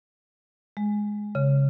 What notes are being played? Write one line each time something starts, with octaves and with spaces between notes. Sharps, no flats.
G#3
C#3